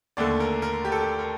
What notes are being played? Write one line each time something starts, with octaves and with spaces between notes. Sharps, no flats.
D#2 D3 A3 D5
A#4
A#4
G4
A4
G4
A#4